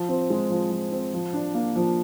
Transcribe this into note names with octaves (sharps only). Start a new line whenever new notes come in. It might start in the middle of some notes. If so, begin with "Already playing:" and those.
Already playing: F3
C4
G#3
F3
F3
C4
F3
D4
A#3
F3